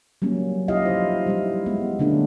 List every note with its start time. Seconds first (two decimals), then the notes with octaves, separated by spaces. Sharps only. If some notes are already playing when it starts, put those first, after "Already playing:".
0.22 F#3 G3 A#3 C#4
0.68 D#4 E4 G4 D#5 F5
0.86 F3 C5
1.27 G3 E4
1.66 G#3 B3
1.99 D3 G#3 A3 B3 C#4 D4